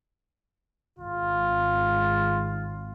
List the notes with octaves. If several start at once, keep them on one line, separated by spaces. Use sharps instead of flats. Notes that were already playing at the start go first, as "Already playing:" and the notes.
G#1 F4